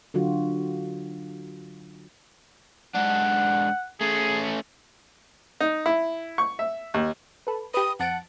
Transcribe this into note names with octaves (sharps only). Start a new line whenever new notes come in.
D3 F#3 F4 F#4
G#2 D4 F#5
A3 C#4 G#4
D#4
E4
C#6
E5
D#2
A4 B4
G4 B4 D#6
F2 F#5 A5 D7